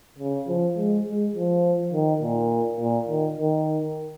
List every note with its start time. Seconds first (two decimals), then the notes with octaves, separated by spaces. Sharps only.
0.19 C#3
0.48 F3
0.77 G#3
1.06 G#3
1.35 F3
1.93 D#3
2.22 A#2
2.80 A#2
3.08 D#3
3.38 D#3